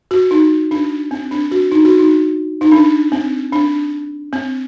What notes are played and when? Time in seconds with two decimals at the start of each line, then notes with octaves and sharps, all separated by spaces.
0.11 F#4
0.31 D#4
0.71 D4
1.11 C4
1.31 D4
1.51 F#4
1.72 D#4
1.85 F#4
2.00 D#4
2.61 D#4
2.72 D4
3.12 C4
3.52 D4
4.33 C4